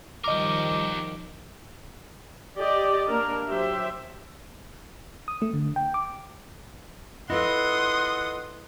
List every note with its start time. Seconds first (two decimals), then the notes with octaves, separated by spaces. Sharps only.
0.24 D#3 F3 G3 G4 A#4 D#5 D6
2.57 G4 D5 D#5
3.08 A#3 D4 A#4
3.48 F#3 G4 C5 E5
5.28 D#6
5.42 A3
5.54 D3
5.76 G5
5.94 D6
7.30 E4 F4 A4 B4 D#5 F#5 C6 D#6